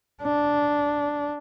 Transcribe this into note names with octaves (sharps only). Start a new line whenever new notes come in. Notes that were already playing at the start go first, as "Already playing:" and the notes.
D4